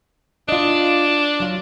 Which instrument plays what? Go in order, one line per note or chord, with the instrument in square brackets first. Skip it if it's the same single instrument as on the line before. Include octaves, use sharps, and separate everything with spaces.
[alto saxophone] D4 [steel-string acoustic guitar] F4 D#5
[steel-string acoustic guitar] F#3 F4